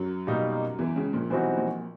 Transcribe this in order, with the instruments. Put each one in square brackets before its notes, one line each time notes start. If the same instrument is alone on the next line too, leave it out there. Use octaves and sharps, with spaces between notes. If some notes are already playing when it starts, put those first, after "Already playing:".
Already playing: [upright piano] F#2 F#3
[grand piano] B2 G3 A#3 D#4 G4
[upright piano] E2 E3
C#2 C#3
A#1 A#2
[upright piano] B1 B2 [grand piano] E3 G3 C4 D#4 F#4
[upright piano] A#1 A#2